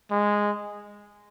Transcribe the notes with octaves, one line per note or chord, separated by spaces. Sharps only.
G#3